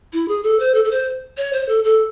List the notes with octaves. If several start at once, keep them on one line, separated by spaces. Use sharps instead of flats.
E4
G#4
A4
C5
A4
A4
C5
C#5
C5
A4
A4